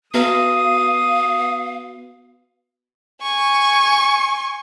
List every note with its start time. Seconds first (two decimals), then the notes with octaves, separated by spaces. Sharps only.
0.14 B3 F#4 B4 F5 D#6
3.22 G#5 C#6